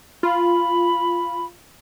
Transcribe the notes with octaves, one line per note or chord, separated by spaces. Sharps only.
F4 B5